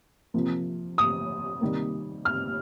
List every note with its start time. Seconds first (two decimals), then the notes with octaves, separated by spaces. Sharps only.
0.34 C3 F3 A#3
0.98 D#6
1.61 C3 D#3 G3 A#3
2.25 F6